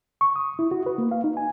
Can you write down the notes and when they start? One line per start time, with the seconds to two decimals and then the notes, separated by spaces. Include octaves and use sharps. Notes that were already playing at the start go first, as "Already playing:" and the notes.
0.21 C#6
0.36 D#6
0.59 E4
0.71 F#4
0.86 B4
0.98 A#3
1.11 F5
1.24 D#4
1.37 G#5